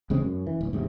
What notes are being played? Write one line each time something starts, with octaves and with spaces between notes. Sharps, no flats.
E2 C#3 G#3 C4
F#2
E3
D1
E1 G#2 C3